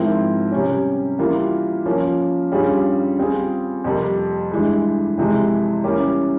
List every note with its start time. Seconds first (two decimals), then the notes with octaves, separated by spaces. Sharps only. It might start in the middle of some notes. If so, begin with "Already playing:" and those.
Already playing: G#2 F3 C4 E4 A#4
0.52 C3 G3 C#4
1.19 E3 G3 A#3 F4
1.86 F3 A#3 C#4 F4
2.52 G2 G3 C#4 F4 G#4
3.18 G3 C4 F4 G#4
3.84 F2 C3 G3 A#3
4.51 G2 E3 G#3
5.18 F2 C3 E3 G#3
5.84 E3 G3 A#3 C#4 G4